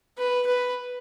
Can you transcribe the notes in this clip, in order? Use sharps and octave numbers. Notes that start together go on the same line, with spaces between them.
B4
B4